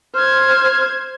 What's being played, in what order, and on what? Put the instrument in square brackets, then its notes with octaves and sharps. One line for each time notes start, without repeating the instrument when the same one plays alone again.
[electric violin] C5 G#6 [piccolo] F6